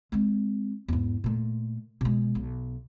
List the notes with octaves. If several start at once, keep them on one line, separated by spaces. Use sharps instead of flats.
G#3 C4
E2 G#2
A#2 A3
B2 G#3
B1